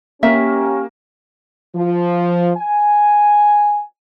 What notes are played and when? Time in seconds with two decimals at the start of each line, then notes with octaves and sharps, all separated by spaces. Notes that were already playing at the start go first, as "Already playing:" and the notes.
0.23 A#3 C#4 G4 E5
1.76 F3
2.57 G#5